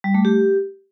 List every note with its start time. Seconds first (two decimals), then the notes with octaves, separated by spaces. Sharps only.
0.04 G3
0.14 A3
0.25 G4